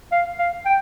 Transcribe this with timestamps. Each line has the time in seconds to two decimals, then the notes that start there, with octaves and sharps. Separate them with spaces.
0.12 F5
0.39 F5
0.66 G5